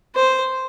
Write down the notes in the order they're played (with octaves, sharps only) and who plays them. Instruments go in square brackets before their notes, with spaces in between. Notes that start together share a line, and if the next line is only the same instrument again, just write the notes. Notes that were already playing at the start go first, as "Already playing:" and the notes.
[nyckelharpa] C5